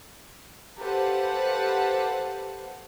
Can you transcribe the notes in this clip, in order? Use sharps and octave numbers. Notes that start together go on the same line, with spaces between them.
G4 A4 B4 C5 F5 F#5